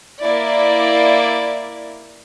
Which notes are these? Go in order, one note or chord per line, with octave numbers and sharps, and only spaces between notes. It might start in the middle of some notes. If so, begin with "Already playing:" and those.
A#3 E4 D5